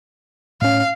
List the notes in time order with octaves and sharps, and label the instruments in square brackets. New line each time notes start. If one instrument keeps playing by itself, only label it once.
[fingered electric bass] A2 C#4 [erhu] F5